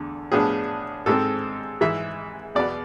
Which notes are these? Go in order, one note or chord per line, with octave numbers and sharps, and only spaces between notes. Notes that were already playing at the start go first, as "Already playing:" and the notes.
Already playing: E2 D3 A3
A2 F3 B3 D4 G#4
G#2 G#3 C4 A4
G#2 E3 G#3 E5
E2 B2 B3 D5